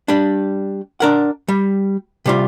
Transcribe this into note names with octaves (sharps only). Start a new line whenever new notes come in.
G3 D4
D4 A#4 F#5
G3
C3 G3 F4